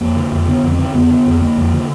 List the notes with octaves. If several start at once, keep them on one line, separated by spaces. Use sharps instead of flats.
F2 A#3
D3
F2
D3 B3
F2
C4
D3
F2 B3
D3
F2
D3 A#3
F2
D3